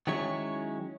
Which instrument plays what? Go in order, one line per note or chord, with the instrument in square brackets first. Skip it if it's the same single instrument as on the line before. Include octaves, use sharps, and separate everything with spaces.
[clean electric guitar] D#3 F#3 G#3 C#4 E4 C#5